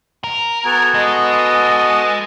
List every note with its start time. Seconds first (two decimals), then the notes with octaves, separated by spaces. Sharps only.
0.24 A#4
0.65 B3 F#4 A4 G#5
0.94 G#3 D#5